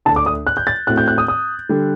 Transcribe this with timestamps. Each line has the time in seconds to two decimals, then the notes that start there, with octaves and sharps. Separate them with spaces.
0.05 D2 D3 A3 D4 A5
0.16 D6
0.26 D#6
0.47 F#6
0.57 G6
0.67 A6
0.87 A2 A3 C4 F#4 F#6
0.97 G6
1.08 F#6
1.18 D#6
1.28 D#6
1.69 D3 G3 D4 A4